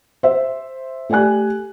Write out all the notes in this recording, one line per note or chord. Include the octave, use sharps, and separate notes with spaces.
C5 E5
A3 G4 D5 G#5 F#6